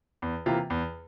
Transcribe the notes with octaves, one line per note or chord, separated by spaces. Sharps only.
E2
C3 E3 A#3 F4
E2